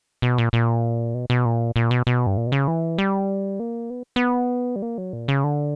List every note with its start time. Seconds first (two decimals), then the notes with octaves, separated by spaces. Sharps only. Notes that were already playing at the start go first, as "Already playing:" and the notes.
0.22 B2
0.38 A#2
0.53 A#2
1.14 B2
1.30 B2
1.45 A#2
1.76 A#2
1.91 B2
2.07 B2
2.27 G2
2.37 A#2
2.47 B2
2.52 C#3
2.68 E3
2.98 G3
3.60 A#3
3.90 B3
4.16 B3
4.76 G3
4.82 A#3
4.98 F#3
5.13 A#2
5.28 C#3
5.44 D3